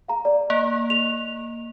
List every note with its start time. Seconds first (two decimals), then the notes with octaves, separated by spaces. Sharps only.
0.08 F5 A#5
0.25 D5
0.50 A#3
0.90 F7